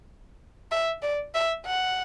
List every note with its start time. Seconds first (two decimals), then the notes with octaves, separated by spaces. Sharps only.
0.72 E5
1.02 D5
1.35 E5
1.66 F#5